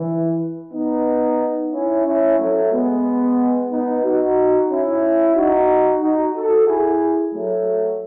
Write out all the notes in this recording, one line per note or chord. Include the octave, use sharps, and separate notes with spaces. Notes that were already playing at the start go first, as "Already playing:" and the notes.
Already playing: E3
B3 D#4
C#4 E4
C#4 E4
F#3 A3
G#3 B3
B3 D#4
D#4 F#4
C#4 E4
D#4 F#4
D#4 F#4
F#4 A4
E4 G#4
F#3 A3